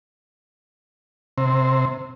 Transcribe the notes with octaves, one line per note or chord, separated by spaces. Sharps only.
C3